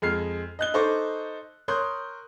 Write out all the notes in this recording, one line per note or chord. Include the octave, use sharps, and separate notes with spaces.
F2 G#3 F6 C7
D#5 F#6 G7
D#4 A4 C5 C#6 D6
A#4 C#5 C6 D#6 F#6 G6